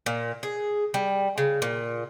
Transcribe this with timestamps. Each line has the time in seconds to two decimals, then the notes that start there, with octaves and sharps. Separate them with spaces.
0.06 A#2
0.43 G#4
0.94 G3
1.38 C#3
1.62 A#2